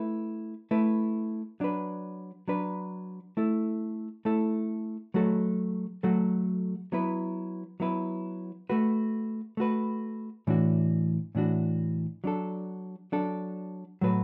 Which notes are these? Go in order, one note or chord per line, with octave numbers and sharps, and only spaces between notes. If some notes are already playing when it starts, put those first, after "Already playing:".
Already playing: A3 E4 B4
A3 E4 B4
F#3 D4 B4
F#3 D4 B4
A3 E4 A4
A3 E4 A4
F#3 A3 F#4 A4
F#3 A3 F#4 A4
F#3 B3 E4 B4
F#3 B3 E4 B4
A3 F#4 B4
A3 F#4 B4
A2 E3 D4 F#4
A2 E3 D4 F#4
F#3 D4 A4
F#3 D4 A4
A2 F#3 A3 F#4 B4